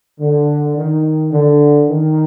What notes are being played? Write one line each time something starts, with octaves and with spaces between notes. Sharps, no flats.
D3
D#3
D3
D#3